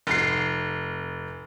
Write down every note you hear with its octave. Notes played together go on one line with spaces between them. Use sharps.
F1 C7